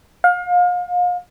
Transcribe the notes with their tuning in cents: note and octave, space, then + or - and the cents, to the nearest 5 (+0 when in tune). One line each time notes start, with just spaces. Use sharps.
F5 +35